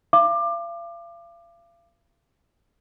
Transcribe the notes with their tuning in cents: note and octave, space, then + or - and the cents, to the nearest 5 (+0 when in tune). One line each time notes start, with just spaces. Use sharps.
F5 -40 D6 +25